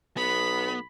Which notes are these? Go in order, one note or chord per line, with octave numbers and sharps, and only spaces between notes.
B1 B3 B5